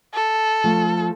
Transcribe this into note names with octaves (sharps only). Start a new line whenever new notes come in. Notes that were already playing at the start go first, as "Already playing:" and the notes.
A4
F3 A3